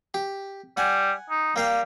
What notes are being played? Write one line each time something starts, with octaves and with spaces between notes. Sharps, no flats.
G4
G3 F#5 G#5
D#4
G3 A#3 F5 G5